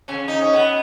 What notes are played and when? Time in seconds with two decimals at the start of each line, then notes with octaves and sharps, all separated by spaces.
0.08 C#3 C#4
0.28 D#4
0.41 C#4
0.53 B2 B3